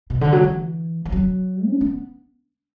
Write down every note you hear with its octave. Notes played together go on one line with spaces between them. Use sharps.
B2
D3
F#3
E3
E3
F#3
D4
B3